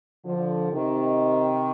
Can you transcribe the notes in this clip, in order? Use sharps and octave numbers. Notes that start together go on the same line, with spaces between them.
D3 F3
C3 D#3